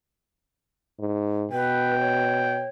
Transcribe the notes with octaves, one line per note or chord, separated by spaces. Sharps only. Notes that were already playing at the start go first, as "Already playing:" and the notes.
G#2
B2 B4 G5
C#5